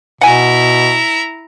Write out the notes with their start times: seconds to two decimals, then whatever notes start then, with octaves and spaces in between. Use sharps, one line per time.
0.21 B2 E4 F#5 G#5 A#5